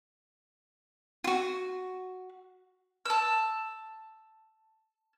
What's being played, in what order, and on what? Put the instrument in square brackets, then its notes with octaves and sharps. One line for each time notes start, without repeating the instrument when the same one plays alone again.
[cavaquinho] F4 F#4
[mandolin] A5 E6